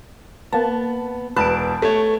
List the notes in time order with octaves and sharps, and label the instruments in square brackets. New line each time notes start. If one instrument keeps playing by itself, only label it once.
[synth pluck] A#3 A5 [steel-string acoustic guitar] B3
[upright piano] E1 F#6 [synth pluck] B4 D7 [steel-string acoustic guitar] A5
[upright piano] A3 C#5